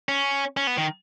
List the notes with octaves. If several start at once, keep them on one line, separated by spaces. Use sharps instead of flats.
C#4
C#4
B3
D#3